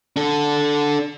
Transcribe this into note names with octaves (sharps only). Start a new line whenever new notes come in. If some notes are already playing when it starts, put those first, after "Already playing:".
D4 A4